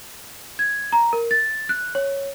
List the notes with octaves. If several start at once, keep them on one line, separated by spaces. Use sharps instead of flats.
G#6
A#5
A#4
A6
F#6
C#5